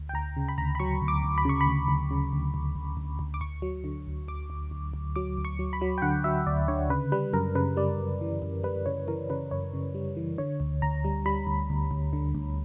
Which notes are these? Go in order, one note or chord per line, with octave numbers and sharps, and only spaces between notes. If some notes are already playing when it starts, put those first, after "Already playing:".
Already playing: D2
G5
D2 A#5
C#3
B5
D2 A#5
B5
F#3 C#6
D2
D6
D2
B5
C#3 C#6
B5
D2
D2
C#3
D2
D2
D2
D2
D2
D6
D2 C#6
F#3
D3
D2
D2 D6
D2
D2
D2
F#3 D6
D2
C#6
F#3
B5
F#3
G5
D3 F#5
F#3 E5
D2 D5
D3 C#5
C#3 B4
G3 B4
F#2 A#4
C#3 B4
G3 D5
F#2
E3
F#2
G3 B4
C#3 C#5
E3 A#4
C#3 B4
F#2 C#5
C#3
G3
E3
D3 C#5
D2
D2 A#5
G3
G3 B5
D2
D2
D2
D3
D2